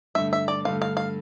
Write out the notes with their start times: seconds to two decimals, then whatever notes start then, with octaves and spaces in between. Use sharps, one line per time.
0.15 G2 D3 A3 E5
0.33 E5
0.48 D5
0.65 G2 D3 A3 F5
0.82 F5
0.97 F5